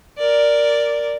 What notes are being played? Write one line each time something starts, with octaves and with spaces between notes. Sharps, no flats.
A#4 D5